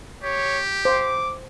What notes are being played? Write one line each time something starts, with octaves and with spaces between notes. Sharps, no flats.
G4 C#5
C5 D6